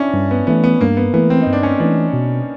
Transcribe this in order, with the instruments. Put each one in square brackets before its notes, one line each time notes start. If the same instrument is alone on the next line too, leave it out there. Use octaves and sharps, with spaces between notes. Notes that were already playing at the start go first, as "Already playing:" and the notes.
Already playing: [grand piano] C#4 D4 E4
[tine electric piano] G2
[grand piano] B3
[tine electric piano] E3 A3 [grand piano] B3
[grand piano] B3
[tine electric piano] G2 [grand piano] A#3
[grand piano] B3
[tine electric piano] E3 A3 [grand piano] B3
[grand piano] C4
[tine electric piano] G2 [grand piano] D#4
[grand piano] D4
C#4
[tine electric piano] E3 A3 [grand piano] D4
[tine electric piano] B2